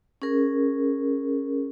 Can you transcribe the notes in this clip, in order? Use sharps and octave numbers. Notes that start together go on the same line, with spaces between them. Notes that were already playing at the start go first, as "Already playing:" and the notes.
C#4 G#4 A#4